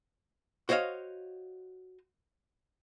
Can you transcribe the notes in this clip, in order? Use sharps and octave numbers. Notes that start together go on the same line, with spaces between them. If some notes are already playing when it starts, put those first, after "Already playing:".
F#4 C5 C#5 D#5 F5